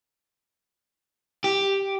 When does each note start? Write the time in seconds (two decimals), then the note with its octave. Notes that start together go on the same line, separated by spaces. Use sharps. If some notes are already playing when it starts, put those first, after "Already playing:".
1.44 G4